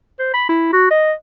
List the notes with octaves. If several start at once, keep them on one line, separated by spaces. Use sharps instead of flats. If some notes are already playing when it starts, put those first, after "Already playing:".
C5
B5
E4
F#4
D#5